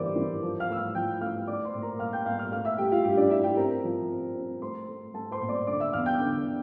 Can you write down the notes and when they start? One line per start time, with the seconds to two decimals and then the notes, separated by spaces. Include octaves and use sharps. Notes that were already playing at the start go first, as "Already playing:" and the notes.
Already playing: G2 E3 A#3 C5 D5 D6
0.16 E3
0.43 F3
0.60 F5 F6
0.69 A3 E6
0.77 F5 F6
0.95 F3 G5 G6
1.21 A3 F5 F6
1.47 A3 D5 D6
1.65 C5 C6
1.74 A#2
1.82 A#4 A#5
1.99 A#2 F5 F6
2.13 G5 G6
2.26 A#2 F5 F6
2.38 F5 F6
2.52 A3 F5 F6
2.65 E5 E6
2.78 A3 G4 G5
2.92 F4 F5
3.04 G2 G4 G5
3.17 D4 D5
3.30 E4 E5
3.43 G4 G5
3.56 C4 A#4 A#5
3.84 F3
4.10 C4
4.35 C4
4.62 A3 C5 C6
4.88 A3
5.14 A3 A4 A5
5.31 C5 C6
5.40 A#2
5.49 D5 D6
5.67 D3 D5 D6
5.80 E5 E6
5.93 E2 F5 F6
6.06 G5 G6
6.19 D3